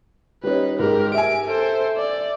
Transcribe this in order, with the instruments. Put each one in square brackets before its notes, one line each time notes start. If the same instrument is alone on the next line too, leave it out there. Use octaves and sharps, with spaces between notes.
[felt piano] G3 C#4 [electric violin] D#4 B4
[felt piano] G#2 [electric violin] G4 A#4
[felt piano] E5 G#5 [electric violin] D7
[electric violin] A4 C5
D5